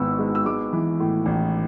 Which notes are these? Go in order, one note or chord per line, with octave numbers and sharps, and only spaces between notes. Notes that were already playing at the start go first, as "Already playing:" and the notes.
Already playing: G#1 G#2 B3 E6
G#3
E6
G#3 D6
E3
A2
A1